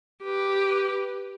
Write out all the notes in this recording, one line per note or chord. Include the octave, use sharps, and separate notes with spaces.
G4 B4